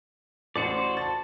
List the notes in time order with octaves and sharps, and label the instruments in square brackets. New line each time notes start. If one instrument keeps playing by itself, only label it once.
[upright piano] A1 A2 C#7 [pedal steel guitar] F#4 C5 D5
[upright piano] A5 A6